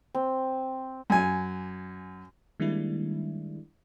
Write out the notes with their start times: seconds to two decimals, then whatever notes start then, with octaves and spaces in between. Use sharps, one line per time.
0.15 C4
1.10 F#2 G#5
2.60 D#3 G3 G#3 A#3 D4 E4